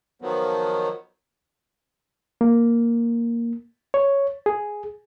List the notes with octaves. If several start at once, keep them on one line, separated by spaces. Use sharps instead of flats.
D#3 F3 F#3 B3
A#3
C#5
G#4